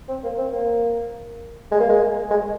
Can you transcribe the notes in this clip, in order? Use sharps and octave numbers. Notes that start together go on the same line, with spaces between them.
C4
A#3
C4
A#3
G#3
A#3
G#3
G#3